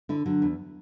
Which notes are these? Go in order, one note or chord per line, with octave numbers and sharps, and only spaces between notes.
D3 E4
D3 F#3
E2